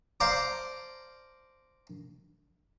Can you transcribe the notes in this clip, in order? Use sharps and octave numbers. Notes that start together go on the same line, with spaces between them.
C5 D5 F5 A5 A#5 D6